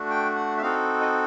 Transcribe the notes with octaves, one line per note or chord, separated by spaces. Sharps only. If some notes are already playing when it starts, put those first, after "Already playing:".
Already playing: A3 D4 F#4
G5
F#5
E5
C4 D#4 F#4 A4 F5
D#5